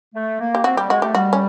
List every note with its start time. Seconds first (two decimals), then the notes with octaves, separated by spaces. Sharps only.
0.15 A3
0.40 A#3
0.55 G4
0.64 C4 F#4
0.77 G3 G4
0.90 G#3 F#4
1.02 A3 G4
1.15 G3 F#4
1.33 C#4